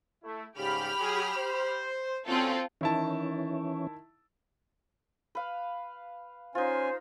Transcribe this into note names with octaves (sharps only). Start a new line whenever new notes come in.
A3 E4
G#2 C#3 G3 G4 B5 F6
F#3 G#4
C5
D2 C4 C#4 F4 A4
D#3 E3 C#4 E4 A5
B4 F5
C#4 D#4 F4 C5 G#5